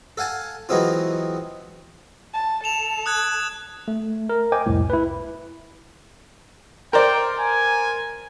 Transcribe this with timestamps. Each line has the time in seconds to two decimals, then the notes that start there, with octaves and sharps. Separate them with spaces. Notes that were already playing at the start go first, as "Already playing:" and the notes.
0.17 A4 F5 F#5 G#5 A5
0.69 E3 F#3 G#3 B3 C4 F4
2.34 A5
2.64 A4 E7 F7
3.06 D#6 F#6 G#6
3.88 A3
4.29 A#4
4.52 C5 D#5 G5 G#5 D6
4.66 C2 F2 A2
4.90 E4 B4
6.93 A#4 C5 D5 G5
7.40 G#5